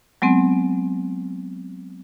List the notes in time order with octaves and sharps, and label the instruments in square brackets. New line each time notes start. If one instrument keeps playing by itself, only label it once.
[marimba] F#3 G#3 B3 C4